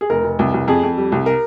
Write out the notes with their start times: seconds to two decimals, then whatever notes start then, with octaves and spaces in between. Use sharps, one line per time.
0.01 G#4
0.10 F1 A#4
0.24 F1
0.39 C2
0.54 C2
0.68 F2 G#4
0.83 F2
0.98 G3
1.12 C2
1.26 A#4